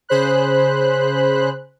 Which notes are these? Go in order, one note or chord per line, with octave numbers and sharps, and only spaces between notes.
C#3 G#4 C5 B5 F#6